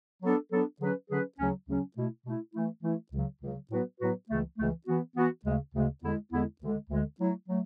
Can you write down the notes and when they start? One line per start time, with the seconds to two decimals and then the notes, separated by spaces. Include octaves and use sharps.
0.23 F#3 B3 D4 A4
0.51 F#3 B3 D4 A4
0.80 D3 F#3 C#4 G#4 B4
1.10 D3 F#3 C#4 G#4 B4
1.38 D2 C#3 F#3 C#4
1.68 D2 C#3 F#3 C#4
1.96 B2 A3 E4
2.25 B2 A3 E4
2.54 E3 A3 E4
2.83 E3 A3 E4
3.12 C#2 C#3 F#3
3.42 C#2 C#3 F#3
3.71 A2 F#3 B3 F#4 B4
4.00 A2 F#3 B3 F#4 B4
4.30 C#2 C#3 E3 A3
4.59 C#2 C#3 E3 A3
4.87 E3 B3 F#4
5.16 E3 B3 F#4
5.45 D2 C#3 G#3
5.75 D2 C#3 G#3
6.03 E2 D3 G#3 B3 E4
6.32 E2 D3 G#3 B3 E4
6.62 D2 D3 G#3
6.90 D2 D3 G#3
7.20 F#3 A3 E4
7.49 F#3 A3